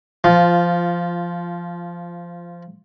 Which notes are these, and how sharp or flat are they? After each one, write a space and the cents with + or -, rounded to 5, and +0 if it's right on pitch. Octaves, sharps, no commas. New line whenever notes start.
F3 -15 F4 +0